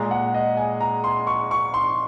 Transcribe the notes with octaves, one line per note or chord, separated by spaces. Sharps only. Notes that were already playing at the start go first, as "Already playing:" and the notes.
Already playing: A#2 G#3 A#5
F#5
D#5
G#5
A#5
C6
C#6
C#6
C6